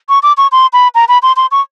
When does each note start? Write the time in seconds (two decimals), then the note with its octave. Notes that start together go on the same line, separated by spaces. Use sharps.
0.09 C#6
0.23 D6
0.37 C#6
0.52 C6
0.73 B5
0.95 A#5
1.08 B5
1.23 C6
1.36 C6
1.51 C#6